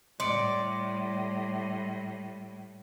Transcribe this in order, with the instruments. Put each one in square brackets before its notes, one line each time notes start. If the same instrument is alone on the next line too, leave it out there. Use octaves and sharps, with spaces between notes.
[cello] A2 G3 [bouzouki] D5 [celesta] C6 C#7 D7